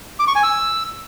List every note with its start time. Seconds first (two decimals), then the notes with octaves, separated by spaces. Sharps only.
0.20 D6
0.28 C#6
0.35 G#5
0.43 E6